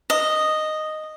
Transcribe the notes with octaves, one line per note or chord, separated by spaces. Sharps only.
D#5